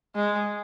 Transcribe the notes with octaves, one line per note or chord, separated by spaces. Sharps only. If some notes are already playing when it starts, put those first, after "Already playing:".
G#3